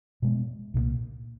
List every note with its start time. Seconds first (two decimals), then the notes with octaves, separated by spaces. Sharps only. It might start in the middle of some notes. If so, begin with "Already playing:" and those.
0.22 B2 G#3 B3
0.74 C2 A#2 G3 A#3